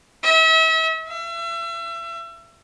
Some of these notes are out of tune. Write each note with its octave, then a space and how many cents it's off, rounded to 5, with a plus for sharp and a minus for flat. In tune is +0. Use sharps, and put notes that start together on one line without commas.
E5 -40
E5 +35